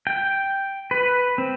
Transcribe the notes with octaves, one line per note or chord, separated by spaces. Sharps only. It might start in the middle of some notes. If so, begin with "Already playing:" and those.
G5
B4
C4